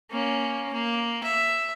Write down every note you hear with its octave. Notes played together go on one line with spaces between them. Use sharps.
A#3 C#4
A#3
E5